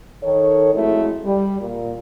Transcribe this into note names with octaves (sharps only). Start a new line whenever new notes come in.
D#3 A4 C#5
F2 F#3 G#3 A3 E4
G3
A#2